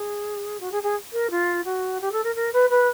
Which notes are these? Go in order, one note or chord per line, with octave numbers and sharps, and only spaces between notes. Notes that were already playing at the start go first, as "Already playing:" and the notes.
Already playing: G#4
F#4
G#4
G#4
A#4
F4
F#4
G4
A4
A#4
A#4
B4
B4